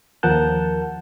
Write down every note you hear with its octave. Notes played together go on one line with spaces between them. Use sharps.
D#2 F3 A#4 F#5 A5 G6